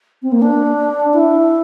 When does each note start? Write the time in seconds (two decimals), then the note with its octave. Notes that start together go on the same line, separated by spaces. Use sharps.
0.22 C4
0.32 A#3
0.42 D4
1.14 E4